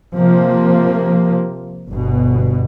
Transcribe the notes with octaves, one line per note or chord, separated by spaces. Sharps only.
C3 F3 A#3
G1 B2